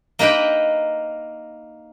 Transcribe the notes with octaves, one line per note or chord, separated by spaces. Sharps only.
A#3 D#4 B4 G5 B5